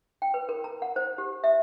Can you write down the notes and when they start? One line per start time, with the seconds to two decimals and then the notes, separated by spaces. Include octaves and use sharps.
0.22 G5
0.34 B4
0.49 A#4
0.64 A#5
0.82 F#5
0.96 C5
1.18 G4
1.44 E5